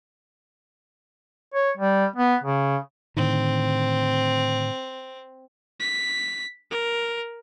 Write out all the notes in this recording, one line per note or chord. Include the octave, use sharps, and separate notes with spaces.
C#5
G3
B3
C#3
A2 D3 D#3 C4
B6
A#4